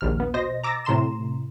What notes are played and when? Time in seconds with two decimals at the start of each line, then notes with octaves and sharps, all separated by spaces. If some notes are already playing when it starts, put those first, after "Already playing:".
0.01 A#1 D#2 F6
0.20 B3
0.34 B2 C5 D#5 A#6
0.64 A#5 D6 E6 A6 A#6
0.85 A2 C3 A#5 C6 E7